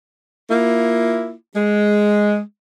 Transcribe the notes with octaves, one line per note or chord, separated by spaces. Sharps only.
A#3 E4 F4
G#3